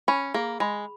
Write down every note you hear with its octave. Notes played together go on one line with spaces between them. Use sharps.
C#4 B5
A#3 G#4
G#3 B5